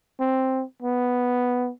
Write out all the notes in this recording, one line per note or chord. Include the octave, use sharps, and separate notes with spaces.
C4
B3